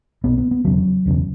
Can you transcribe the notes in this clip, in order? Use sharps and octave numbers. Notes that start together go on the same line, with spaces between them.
B1 B2 B3
B3
B3
E1 E2 C#3 F#3
E1 E2 C#3